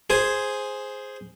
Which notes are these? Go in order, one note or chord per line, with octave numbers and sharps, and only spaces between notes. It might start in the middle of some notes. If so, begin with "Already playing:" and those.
G#4 C5 G#5